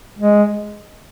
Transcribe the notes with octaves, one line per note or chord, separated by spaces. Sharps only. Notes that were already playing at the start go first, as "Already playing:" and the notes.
G#3